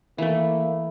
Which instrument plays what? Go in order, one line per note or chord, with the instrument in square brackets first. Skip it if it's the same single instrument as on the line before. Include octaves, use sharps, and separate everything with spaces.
[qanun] E3 A3 [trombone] A#3